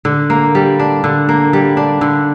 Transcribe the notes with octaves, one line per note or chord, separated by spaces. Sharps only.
D3
A#3
G3
D4
D3
A#3
G3
D4
D3